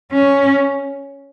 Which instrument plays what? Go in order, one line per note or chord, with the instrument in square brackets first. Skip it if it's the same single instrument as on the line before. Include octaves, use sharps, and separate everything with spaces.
[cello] C#4